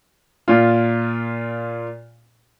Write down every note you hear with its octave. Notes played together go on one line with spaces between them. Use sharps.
A#2 F4